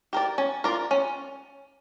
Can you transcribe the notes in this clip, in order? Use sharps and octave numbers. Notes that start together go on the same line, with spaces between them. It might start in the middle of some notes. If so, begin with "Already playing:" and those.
G4 A#4 D5
C#4
F4 A#4 D5
C#4